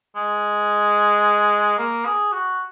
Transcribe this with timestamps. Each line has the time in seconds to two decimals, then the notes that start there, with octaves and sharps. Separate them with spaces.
0.16 G#3
1.78 A#3
2.05 G#4
2.33 F#4